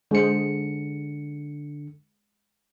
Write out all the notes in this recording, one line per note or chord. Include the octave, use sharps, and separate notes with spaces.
D3 G#3 G#4 C5 C#7